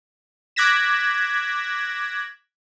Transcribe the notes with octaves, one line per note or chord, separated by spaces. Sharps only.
D6 F#6 G#6 A#6 B6 E7